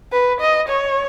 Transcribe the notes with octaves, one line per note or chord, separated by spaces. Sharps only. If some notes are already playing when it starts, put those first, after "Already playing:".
B4
D#5
C#5